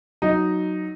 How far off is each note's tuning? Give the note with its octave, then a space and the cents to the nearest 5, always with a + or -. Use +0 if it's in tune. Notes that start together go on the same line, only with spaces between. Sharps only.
F#3 +0 D#4 +0